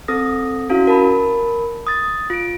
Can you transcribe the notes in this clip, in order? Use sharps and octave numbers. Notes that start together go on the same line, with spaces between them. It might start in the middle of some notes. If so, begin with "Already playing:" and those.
C4 A4 D#6 A#6
C#4 E4 F#4 F5
A#4 A5 B5
D#6 A6
F4 D7